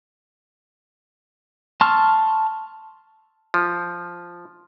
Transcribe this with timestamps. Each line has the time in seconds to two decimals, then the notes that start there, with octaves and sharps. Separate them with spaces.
1.81 A5 C6 C#6 E6 F6
3.54 F3